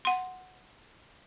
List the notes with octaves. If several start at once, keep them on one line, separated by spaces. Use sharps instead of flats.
F#5 C6